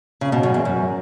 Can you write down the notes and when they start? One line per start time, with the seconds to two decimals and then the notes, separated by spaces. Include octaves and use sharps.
0.21 C#3
0.32 B2
0.43 F#2
0.54 E2
0.65 F#2